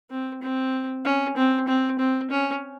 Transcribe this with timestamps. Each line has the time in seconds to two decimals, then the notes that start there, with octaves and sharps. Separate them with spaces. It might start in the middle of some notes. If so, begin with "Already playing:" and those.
0.10 C4
0.42 C4
1.05 C#4
1.36 C4
1.67 C4
1.99 C4
2.30 C#4